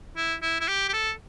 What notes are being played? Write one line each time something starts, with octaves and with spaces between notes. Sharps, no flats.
E4
E4
E4
G4
G4
A4